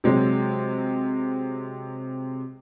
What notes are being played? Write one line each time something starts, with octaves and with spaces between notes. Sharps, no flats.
C3 F#3 G#3